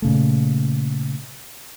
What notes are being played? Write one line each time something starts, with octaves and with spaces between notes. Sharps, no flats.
A#2 C#3 A3